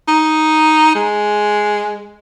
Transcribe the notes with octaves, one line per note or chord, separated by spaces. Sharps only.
D#4
G#3